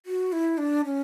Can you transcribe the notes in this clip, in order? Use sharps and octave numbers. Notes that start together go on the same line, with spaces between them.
F#4
E4
D4
C#4